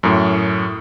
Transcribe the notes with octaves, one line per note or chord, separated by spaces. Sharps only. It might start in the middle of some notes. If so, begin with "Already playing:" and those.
F#2 A2